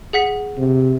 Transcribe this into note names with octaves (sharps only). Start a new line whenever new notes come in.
G#4 F#5 B6
C3